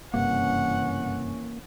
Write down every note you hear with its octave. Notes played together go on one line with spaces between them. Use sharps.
F#1 G2 C3 E3 A#3 C#4 F#5